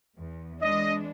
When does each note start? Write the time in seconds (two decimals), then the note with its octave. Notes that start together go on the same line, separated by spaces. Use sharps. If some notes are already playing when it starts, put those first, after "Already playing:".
0.18 E2
0.61 E3 G#3 D4 D#5